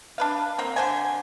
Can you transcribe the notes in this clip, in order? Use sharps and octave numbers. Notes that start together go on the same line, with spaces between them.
D4 B4 F5
A#3 C4
D3 C5 G#5